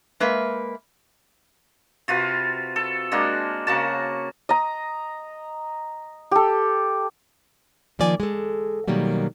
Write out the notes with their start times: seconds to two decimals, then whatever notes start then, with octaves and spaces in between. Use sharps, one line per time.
0.20 G#3 A#3 B4 E5
2.08 C3 F4 F#4 B4
2.76 A4
3.12 G#3 A#3 D4 F#4
3.67 C#3 A#3 F#4 A5
4.49 D#5 A#5
6.31 G4 A4
7.99 D#3 F3 A#3 D5 G#5
8.20 G#3 A4
8.88 B2 D#3 F#3 G3 A#3